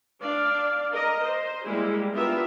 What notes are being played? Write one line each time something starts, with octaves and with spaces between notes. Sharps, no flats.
D4 D5 F5
A#4 D#5
C5
G3 G#3 A#3 E4 G4 G#4
B3 D4 F4 G4 A#4 E5